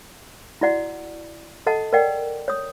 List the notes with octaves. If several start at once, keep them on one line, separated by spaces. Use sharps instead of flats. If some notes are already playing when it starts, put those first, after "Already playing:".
E4 F#4 D5 F#5 A#5
A4 D#5 F#5 A5
A#4 C#5 D5 F#5 G5
C#5 D#6